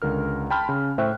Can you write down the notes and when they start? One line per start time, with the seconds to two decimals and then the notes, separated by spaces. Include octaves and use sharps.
0.02 C#2 D3 A#4 F6
0.50 G5 A5 B5 C6 F6
0.69 C#3
0.98 A2 C5 E5 G5 C#6 F#6